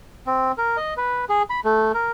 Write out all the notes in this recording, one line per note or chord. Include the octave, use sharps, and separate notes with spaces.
C4
A#4
D#5
B4
G#4
B5
A3
A#4